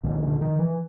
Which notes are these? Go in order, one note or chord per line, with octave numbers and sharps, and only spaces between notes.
C2 A#2 D#3
D3
D#3
E3